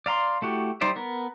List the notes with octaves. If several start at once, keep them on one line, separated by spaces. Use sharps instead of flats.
D5 F5 A#5 C6
A3 E4 F#4 G4
G3 D#4 C5 D5 E5
B3 A#4